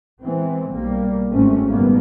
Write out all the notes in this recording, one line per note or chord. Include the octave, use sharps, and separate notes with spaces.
E3 G#3 B3 C4
B1 G3 A#3
G#1 G#2 C3 A3 C4 C#4
F#1 G#2 B2 G3 A#3 B3